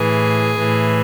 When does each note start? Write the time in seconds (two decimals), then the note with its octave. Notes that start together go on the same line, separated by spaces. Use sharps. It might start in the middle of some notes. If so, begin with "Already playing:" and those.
Already playing: A2 E3 G#4
0.59 A2 E3